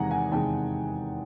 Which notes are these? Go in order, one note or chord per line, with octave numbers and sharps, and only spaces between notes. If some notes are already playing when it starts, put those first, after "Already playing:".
Already playing: E2 C3 D#3 G#3 F#5 G#5 A#5
F#5 G#5
E2 C3 D#3 G#3 G5 A5